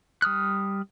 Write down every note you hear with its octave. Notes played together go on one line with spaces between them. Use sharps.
G3 D#6 F6 F#6